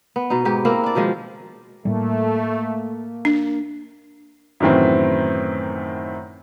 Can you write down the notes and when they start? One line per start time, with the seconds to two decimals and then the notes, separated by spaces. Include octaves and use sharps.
0.16 B3
0.30 B2 D#4
0.45 G#2 B3 G4
0.65 A#3 C4 E4 A#4
0.83 D4 D5
0.95 B2 D#3 F3 G#3
1.85 A2 G3 A3 A#3
3.25 D4
4.60 F#2 A2 D#3 E3 C4